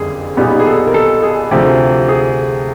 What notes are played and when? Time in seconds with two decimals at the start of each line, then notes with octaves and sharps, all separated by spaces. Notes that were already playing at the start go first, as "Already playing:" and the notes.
Already playing: F#1 F2 D3 G3 G#4
0.37 B1 A#2 G3 B3 D#4 G4
0.59 G#4
0.66 A4
0.87 A#4
0.94 A4
1.23 G#4
1.51 D2 C3 F3 G4
2.09 G#4